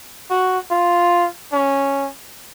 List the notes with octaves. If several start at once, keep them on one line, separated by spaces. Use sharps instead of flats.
F#4
F4
C#4